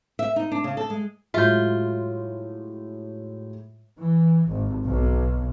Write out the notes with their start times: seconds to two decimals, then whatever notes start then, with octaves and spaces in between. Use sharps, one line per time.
0.19 E5
0.36 D#4
0.51 D4
0.64 C#3
0.77 A4
0.90 G#3
1.34 A2 F#3 G#3 F4 E5 G6
4.01 E3
4.48 G#1
4.85 B1